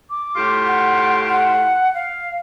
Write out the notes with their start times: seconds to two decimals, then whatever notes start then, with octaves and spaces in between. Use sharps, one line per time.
0.10 D6
0.36 A2 F4 G4
0.66 F#5
1.29 F#5
1.94 F5